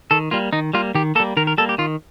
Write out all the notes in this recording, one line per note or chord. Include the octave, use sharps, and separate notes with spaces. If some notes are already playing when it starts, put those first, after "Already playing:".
D#3 A4
G3 A#3 F4
D#3 D#4
G3 A#3 F4
D#3 G4
G3 A#3 A4
D#3 A#4
A#4
G3 A#3 A4
G4
D#3 F4